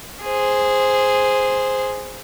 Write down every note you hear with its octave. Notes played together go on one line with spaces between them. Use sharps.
G#4 C5